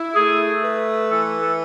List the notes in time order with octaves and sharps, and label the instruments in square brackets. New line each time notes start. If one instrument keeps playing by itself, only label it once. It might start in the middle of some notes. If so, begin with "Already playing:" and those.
Already playing: [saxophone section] E4
[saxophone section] A3 [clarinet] G#4
[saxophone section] B4
[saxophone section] E3 [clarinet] A4
[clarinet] A4